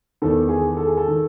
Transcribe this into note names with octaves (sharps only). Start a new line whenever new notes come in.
E2 D#3 A4
G#4
A4
G#4
A4
D#3